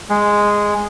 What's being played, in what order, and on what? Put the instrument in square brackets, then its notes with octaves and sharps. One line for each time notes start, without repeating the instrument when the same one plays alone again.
[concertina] G#3